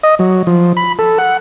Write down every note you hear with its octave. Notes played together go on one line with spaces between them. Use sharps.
D#5
F#3
F3
B5
A4
F#5